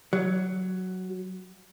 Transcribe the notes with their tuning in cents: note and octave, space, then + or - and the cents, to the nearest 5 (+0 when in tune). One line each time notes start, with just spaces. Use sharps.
F#3 +5